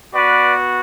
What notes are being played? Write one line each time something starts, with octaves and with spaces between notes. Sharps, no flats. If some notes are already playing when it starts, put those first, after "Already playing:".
B3 F#4 B4 D5